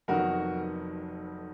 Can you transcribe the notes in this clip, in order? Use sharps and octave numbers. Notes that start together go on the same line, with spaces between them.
F1 F2 D#3 F#3 B3 F#4 A#4